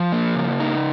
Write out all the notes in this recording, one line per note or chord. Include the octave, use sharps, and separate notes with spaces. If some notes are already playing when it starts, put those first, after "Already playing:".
Already playing: F3
A#3
C#3
D#4